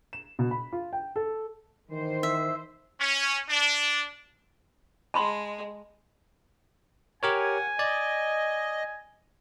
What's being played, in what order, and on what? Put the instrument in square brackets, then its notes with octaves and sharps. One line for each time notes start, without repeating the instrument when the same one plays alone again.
[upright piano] E7
B2
B5
F4
G5
A4
[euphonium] D#3 [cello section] E3 C5
[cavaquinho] E5
[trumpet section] C#4
D4
[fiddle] G#3 [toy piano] A5 B5 C6
[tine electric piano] G4 A#4 C#5 [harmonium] F#5 [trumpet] G#5
[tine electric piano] D5 [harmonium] D#5